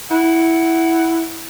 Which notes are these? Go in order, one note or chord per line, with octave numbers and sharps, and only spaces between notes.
E4 F#5